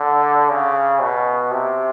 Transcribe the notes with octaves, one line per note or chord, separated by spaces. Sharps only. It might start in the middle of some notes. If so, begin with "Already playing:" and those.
Already playing: D3
C#3
B2
C3